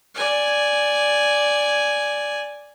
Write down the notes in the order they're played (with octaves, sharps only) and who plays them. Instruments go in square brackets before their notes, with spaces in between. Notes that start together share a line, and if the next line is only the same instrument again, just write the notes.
[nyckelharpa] D5 G#5